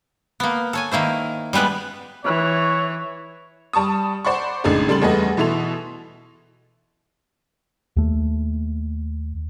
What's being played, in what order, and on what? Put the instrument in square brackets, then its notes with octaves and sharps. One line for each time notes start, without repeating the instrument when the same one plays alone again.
[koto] A#3 B3
A4 C#5 G#5
D#3 A#3 E4 C5
G3 G#3 B3 B4 D5
[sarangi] E3 [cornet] C#5
[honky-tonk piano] G3 A5 C#6 D#6
C5 D5 F#5 B5 C#6
A1 C#3 G#3 D4 D#4 A4
C#3 G3 A4 C6 A6 F#7
E2 G3 A3 G#4 B4 D#5
B2 E3 E4 A4 C6 F7
[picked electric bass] D#2 A3